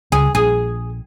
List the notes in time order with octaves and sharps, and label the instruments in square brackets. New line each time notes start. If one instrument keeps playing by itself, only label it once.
[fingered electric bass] C#2 [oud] G#4
[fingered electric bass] A#1 [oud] G#4